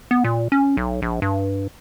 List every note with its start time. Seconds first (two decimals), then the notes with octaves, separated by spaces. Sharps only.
0.11 B3
0.24 A#2
0.52 C#4
0.77 B1
1.02 A#1
1.22 G2